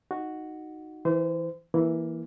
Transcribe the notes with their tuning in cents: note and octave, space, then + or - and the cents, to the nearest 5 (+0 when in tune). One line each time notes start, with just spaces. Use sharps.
D#4 +0 F#4 +0
E3 -10 C5 -35
E3 +0 A#3 +15